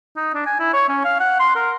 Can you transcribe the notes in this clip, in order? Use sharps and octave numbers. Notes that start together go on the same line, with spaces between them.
D#4
D4
G#5
E4
C#5
C#4
F5
F#5
C6
A#4